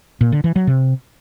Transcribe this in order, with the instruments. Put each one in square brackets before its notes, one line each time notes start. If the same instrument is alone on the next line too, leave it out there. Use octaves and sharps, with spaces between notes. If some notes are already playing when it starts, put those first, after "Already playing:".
[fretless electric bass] A#2
D3
E3
F#3
C3